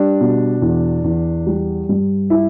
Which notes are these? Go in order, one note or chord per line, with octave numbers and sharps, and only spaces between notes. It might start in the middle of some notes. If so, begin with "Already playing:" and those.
Already playing: G3 D4
B2
E2
E2
G3
G2
E4